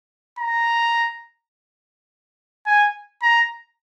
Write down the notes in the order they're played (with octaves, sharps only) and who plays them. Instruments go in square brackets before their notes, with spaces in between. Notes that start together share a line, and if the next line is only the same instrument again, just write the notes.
[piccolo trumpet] A#5
G#5
A#5